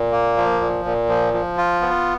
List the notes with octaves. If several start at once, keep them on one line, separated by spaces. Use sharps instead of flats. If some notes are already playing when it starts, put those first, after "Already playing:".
Already playing: A#2
A#3
F3
A#2
A#2
F3
F3
F4
B3